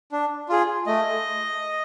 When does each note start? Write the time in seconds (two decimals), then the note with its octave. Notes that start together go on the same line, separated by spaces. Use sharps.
0.12 D4
0.49 F4 G#4
0.86 A3 D#5